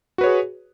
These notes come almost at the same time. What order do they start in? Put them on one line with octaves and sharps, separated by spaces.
F#4 B4 C#5 G#4